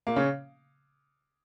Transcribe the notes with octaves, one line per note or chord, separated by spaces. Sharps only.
A#2 A#3
C#3 C#4